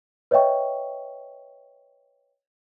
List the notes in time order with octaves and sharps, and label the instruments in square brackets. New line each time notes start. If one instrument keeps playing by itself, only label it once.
[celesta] B4 C#5 D#5 E5 G5 C#6